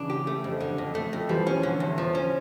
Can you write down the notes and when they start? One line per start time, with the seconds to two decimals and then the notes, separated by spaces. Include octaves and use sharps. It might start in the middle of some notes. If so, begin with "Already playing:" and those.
Already playing: C#3 E3 D4
0.10 G4
0.27 A3
0.44 F2
0.60 D3
0.78 F2
0.95 A3
1.13 F2
1.29 E3 F3 G3
1.47 C#4
1.63 D3
1.80 E2
1.98 F3
2.15 C#4